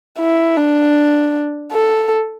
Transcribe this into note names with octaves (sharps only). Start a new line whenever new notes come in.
E4
D4
A4